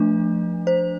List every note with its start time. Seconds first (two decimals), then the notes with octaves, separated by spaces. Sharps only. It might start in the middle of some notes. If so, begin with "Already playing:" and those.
Already playing: F3 A3 D4
0.67 C5